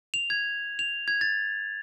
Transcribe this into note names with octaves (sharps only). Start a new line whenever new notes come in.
F7
G#6
F7
G#6
A6